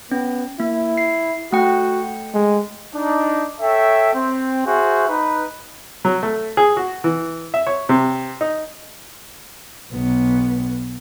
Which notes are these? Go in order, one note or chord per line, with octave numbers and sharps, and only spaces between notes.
B3 C#4
A#3 E4
C7
A3 F#4 G5
G#3
D4 D#4
A4 C#5 E5 G5
C4
F#4 G#4 C5 E5
D#4 B4
F#3
A3
G#4
F#4
E3
E5
C#5
C3
D#4
B1 B3